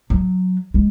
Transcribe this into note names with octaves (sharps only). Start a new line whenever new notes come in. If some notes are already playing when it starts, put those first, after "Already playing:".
F#3
G#3